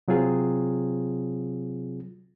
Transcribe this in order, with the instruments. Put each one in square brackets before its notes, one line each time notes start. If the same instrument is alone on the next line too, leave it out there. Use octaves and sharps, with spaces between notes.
[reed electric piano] C3 F#3 C4 F4 G#4